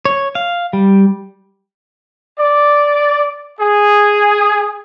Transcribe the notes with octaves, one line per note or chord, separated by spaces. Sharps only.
C#5
F5
G3
D5
G#4